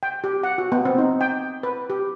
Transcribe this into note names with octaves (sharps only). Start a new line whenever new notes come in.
G5
G4
F#5
F#4
B3
C4
D#4
G5
B4
G4